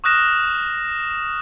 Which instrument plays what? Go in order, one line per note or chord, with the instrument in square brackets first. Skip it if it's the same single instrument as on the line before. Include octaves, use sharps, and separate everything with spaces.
[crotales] C#6 D#6 F6 F#6 A#6 E7